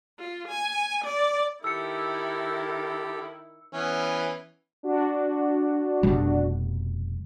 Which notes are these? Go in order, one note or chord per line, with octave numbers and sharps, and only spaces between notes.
F4
G#5
D5
D#3 E4 G4 A4 E6 C#7
E3 B3 C#4
D4 F#4
F1 B2 G3